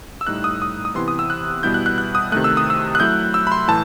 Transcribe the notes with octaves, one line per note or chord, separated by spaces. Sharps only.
E6
A2 G3 D#4 F#6
D#6
D#6
D#6
C3 E3 B3 E4 C6
D#6
E6
F#6
B2 G3 B3 E4 G6
F#6
F#6
F#6
D#6
C3 D#3 A3 F#6
E6
D#6
E6
F#6
F#3 A3 E4 G6
E6
B5
C6
A2 E3 A5